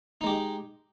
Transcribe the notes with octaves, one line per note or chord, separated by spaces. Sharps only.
G#3 D#4 G4